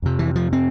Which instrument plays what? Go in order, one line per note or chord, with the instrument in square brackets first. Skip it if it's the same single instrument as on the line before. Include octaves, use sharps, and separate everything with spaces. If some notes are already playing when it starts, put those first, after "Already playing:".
[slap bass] F2 C3
E3
F3
C4